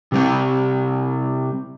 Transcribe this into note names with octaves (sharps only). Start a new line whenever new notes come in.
C3 G3 C4